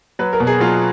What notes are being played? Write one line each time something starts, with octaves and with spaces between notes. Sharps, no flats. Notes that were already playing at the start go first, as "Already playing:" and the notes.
F#3 B4
A#4
B2
G#4
F#3 F4